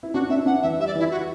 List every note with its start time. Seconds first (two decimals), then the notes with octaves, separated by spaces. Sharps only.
0.03 E4
0.13 D4 F#4
0.29 D4 E5
0.38 E4
0.46 D4 F#5
0.62 E3 E5
0.80 G3 E5
0.87 D5
0.95 E3 E4
1.11 F#4